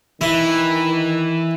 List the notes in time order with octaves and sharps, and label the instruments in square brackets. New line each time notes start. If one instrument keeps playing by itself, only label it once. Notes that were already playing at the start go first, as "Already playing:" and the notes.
[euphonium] D#3 [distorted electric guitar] E3 [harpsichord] E4